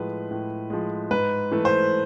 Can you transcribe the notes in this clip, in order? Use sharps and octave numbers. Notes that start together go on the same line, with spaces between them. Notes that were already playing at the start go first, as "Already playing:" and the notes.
Already playing: A2 F3 G#3 B4
A2
F3 G#3
G#2 B4
E3 A3
C5